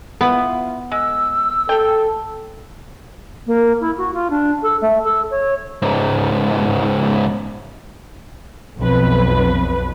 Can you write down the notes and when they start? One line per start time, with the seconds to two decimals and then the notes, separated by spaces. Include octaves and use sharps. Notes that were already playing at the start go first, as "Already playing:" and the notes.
0.21 B3 E4 F4 B4
0.92 G#3 E6
1.69 G4 A4 G5
3.47 A#3
3.80 E4
3.97 F#4
4.14 F4
4.30 D4
4.63 A4
4.81 A3
5.04 A4
5.31 C#5
5.82 C#2 G#2
8.78 B1 F2 B4